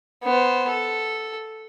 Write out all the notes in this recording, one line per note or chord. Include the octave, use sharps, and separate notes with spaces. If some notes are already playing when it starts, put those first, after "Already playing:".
B3 C5
A4